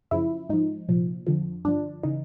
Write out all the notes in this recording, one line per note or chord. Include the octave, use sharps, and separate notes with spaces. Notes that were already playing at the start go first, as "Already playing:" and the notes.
F#2 C#3 F3 E4
G#2 F3 D#4
C2 A#2 F3
F2 D3 F3
G2 D3 F3 D4
C#3 E3 D#4